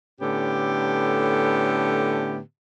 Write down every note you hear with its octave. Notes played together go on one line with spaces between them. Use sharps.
A2 D3 B3 C#4 G4